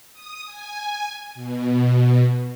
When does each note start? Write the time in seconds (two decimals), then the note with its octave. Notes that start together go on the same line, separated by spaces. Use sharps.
0.13 D#6
0.46 G#5
1.35 B2